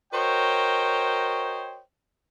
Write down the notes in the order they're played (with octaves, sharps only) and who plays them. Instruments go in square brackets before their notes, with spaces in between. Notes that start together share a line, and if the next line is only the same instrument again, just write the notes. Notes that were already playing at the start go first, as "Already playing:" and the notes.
[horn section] F#4 A#4 C5 C#5 D#5 G5